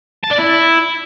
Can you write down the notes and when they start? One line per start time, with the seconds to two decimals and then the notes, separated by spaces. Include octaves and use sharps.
0.24 A5
0.31 D5
0.38 E4